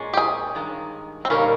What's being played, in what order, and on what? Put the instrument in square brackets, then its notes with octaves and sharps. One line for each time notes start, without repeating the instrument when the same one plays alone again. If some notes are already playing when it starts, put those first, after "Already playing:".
Already playing: [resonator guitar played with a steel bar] A#2 G#3 C#4
[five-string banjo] G4
G#4
[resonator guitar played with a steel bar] G2 D#3 G#3
[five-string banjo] C4
[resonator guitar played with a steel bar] A#2 G3 A#3 D#4 A#4 [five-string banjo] C#4